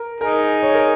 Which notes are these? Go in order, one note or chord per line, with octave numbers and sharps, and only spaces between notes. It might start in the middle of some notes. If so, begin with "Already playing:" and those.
Already playing: A#4
D#4 G#4 A#4
C#5
A#4